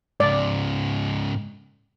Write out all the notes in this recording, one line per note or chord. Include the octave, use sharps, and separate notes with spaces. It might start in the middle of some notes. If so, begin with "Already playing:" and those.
G#2 C#3 D5